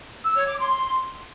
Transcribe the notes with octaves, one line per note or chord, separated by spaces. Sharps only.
E6
C#5
D6
C6